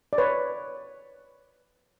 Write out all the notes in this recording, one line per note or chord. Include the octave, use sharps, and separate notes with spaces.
D5
B4 C#5